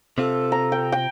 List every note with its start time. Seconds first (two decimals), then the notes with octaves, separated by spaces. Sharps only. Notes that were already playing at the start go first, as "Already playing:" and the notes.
0.18 C3 C4 F4 A4
0.52 A#5
0.72 G5
0.92 G5